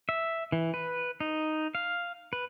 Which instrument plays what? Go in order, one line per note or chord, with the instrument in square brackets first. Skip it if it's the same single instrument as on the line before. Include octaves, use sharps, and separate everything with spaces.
[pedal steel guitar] E5
E3
B4
D#4
F5
B4